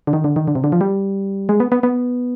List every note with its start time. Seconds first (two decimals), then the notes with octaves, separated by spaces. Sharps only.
0.07 D3
0.13 D#3
0.24 D3
0.36 D#3
0.48 D3
0.55 C3
0.64 D3
0.72 F3
0.81 G3
1.49 G#3
1.60 B3
1.72 B3
1.83 B3